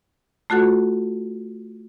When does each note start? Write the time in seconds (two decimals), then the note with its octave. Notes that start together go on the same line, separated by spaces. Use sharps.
0.50 A3 F4 F#4 A4 F#5